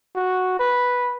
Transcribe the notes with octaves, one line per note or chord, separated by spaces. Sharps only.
F#4
B4